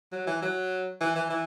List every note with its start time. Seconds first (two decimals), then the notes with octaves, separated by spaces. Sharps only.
0.12 F#3
0.27 E3
0.42 F#3
1.01 E3
1.15 E3
1.30 E3